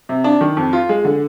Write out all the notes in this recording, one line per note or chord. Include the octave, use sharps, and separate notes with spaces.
C3
D4
D#3
F2
F4
G#3
D3